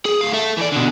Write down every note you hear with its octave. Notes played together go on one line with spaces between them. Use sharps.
G#4
A2 F5
A4 E5
E3 D5
B2 D3